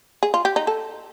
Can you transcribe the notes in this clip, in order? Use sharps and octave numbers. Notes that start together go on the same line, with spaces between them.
G#4
F4
G4
D#4
A4